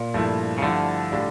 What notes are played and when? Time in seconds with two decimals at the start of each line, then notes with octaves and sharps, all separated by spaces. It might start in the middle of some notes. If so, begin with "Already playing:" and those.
Already playing: A#2
0.14 G2 F3 A3 E4
0.58 C#3
0.62 G2 D3 F3 A3 E4
1.12 A2 G3 D4 F4